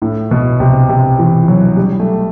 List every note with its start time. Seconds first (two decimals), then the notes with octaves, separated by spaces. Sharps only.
0.02 A2
0.31 B2
0.60 C3
0.89 C3
1.19 E3
1.48 F#3
1.77 G3
1.99 A3